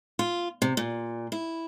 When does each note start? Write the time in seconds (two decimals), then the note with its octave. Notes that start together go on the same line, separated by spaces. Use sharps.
0.19 F4
0.62 C3
0.77 A#2
1.32 E4